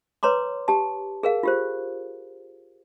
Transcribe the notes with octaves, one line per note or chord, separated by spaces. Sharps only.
B4 C#5 A#5 C6 D6
G4 A5
G#4 A#4 F5
F4 G4 C5